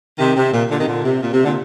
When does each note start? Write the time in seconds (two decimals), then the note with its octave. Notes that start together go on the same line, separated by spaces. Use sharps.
0.18 C3 D#3
0.36 C3
0.52 A#2
0.70 A#2 D3
0.78 C3 D#3
0.86 A#2 D3
1.03 C3
1.21 A#2
1.32 C3
1.44 A#2 D3